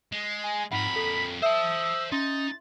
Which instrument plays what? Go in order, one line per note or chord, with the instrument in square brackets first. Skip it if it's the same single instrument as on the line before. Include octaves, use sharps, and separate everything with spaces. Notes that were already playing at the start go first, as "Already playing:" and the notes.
[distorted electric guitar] G#3
[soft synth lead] G#5
[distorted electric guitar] F2 A#4 [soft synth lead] G#2 [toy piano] F#5 [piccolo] B5
[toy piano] A4 [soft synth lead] B6
[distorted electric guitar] C5 A5 [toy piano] E5 [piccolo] D#6 [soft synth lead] E6
[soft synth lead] C#4 [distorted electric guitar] D#4 [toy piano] C6 [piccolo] A6